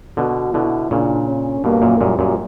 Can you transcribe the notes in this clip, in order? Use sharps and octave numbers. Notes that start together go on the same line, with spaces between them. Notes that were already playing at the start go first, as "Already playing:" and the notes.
B2 D3 F#4
B2 D3 E4
A#2 C#3 D4
C#4
G2 B2 A#3
F#2 A#2
F#2 A#2 G3
F#2 A#2